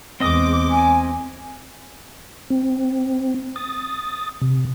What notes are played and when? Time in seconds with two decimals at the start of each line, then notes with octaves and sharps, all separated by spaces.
0.20 E2 G#3 C4 D#5 D6 D#6
0.71 G#5
2.50 C4
3.56 D#6 A6
4.41 C3